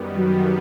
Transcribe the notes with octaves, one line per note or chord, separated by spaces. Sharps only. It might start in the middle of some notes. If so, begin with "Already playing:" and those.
Already playing: F#2 D#3 G3 B3
F#3